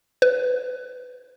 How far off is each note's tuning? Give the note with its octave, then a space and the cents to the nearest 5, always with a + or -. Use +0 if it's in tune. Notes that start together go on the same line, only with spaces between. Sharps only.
B4 +20